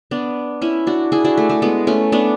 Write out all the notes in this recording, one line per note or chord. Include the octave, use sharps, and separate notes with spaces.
B3 D4
C#4 E4
D4 F#4
E4 G#4
D4 F#4
A3
A3
G#3 B3
A3 C#4
B3 D4